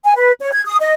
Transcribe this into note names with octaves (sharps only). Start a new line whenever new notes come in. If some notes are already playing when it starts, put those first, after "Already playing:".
G#5
B4
C#5
G#6
D#6
D#5